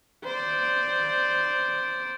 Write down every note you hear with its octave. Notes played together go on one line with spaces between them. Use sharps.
C5 D5